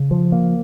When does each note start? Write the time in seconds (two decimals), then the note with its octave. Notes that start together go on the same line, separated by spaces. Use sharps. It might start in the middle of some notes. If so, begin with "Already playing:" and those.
Already playing: C#3
0.11 F3
0.32 A#3